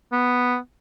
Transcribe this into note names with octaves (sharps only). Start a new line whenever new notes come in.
B3